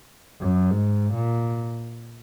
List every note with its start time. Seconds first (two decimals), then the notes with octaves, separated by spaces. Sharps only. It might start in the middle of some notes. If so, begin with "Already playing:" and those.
0.41 F#2
0.71 G#2
1.14 A#2